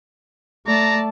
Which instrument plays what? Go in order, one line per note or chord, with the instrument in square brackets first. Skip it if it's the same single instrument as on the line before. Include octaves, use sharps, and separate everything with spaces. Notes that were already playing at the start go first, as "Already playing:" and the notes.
[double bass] A3 [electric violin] D5 A5 [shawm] A#5